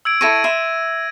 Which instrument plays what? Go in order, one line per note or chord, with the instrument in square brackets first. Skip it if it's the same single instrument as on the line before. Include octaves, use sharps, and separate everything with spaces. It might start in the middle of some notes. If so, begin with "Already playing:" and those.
[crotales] E6 G#6 D7
[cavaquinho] E4 A4 C#6 [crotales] G#6 A#6 D#7
[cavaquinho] E5 C6